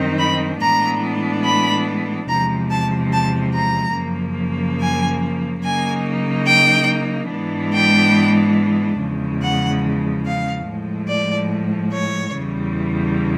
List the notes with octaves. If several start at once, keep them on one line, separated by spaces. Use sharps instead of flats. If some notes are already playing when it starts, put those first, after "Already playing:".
Already playing: F#2 D#3 G3 C4 D#4
B5
A2 E3 G#3 B3 D4 A#5
B5
E2 C3 F3 G#3 A#5
A5
A5
A#5
F#2 C#3 F3 A#3
G#5
C#3 F#3 A#3 D#4 G#5
G5
G#2 E3 G#3 B3 D4
G5
E2 C#3 F3 G#3
F#5
F5
A2 F3 G#3
D5
C#5
E2 C#3 E3 G3